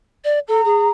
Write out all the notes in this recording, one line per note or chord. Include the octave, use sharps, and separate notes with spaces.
D5
A4 A#5
G#4